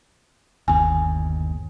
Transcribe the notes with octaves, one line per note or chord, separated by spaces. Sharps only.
G1 D#2 G#5